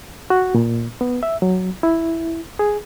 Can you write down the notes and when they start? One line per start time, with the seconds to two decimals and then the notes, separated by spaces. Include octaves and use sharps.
0.30 F#4
0.55 A#2
1.01 B3
1.23 E5
1.42 F#3
1.83 E4
2.59 G#4